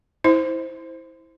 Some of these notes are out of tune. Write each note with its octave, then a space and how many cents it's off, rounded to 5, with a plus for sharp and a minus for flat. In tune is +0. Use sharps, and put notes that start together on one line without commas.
E4 -10 C5 +0